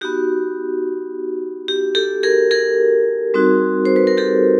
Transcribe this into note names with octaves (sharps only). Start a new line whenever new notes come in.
B3 D#4 F#4 G4
G4
G4 A4
G#4 A#4
G#4 A#4
G3 C4 D#4 F#4
C5
B4
A#4
G4 A4